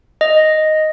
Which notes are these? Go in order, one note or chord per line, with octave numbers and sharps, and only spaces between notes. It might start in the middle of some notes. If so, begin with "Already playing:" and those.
D#5